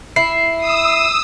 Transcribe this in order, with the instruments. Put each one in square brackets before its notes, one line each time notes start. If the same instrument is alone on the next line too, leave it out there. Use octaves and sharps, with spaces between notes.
[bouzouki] E4 [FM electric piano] C7
[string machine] D#6 E6